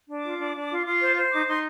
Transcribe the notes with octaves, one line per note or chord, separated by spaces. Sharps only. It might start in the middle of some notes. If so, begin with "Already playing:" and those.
D4
D6
F4
D4
D4
F4
F4
C5
C5
D#4 D6
D#4 C6